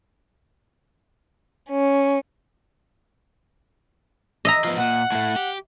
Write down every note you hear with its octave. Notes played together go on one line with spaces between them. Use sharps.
C#4
D#5 E5 A#5
F3 B3
A#2 F#5
A2 A3
G4